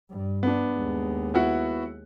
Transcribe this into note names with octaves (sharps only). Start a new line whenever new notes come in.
G2
B3 D4
D#2 G#3
B3 E4 F#4